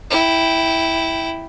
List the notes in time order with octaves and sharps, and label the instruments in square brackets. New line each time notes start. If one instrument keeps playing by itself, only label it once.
[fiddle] E4 G5